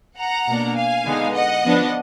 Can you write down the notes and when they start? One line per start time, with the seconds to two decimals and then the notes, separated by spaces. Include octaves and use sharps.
0.19 F#5 A#5
0.47 B2 A#3 D4
0.76 F5 G#5
1.05 D3 G#3 B3 D#4
1.35 D#5 F#5
1.64 F3 B3 D4